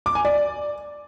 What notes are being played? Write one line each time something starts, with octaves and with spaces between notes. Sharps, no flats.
D6
G#5
D5